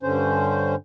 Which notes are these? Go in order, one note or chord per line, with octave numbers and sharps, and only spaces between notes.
G2 D3 C#4 C5